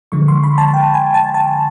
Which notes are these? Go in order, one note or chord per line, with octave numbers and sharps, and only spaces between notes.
D3 F3 G#3 C#6
C6
B5
A5
G5
G#5
A5
A5